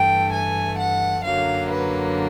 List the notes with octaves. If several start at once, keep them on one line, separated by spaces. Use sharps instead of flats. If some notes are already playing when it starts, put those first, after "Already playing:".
Already playing: G2 E3 A3 G5
G#5
F#5
F#2 D3 F#3 A#3 F5
B4